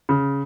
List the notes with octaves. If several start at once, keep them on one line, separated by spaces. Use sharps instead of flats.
C#3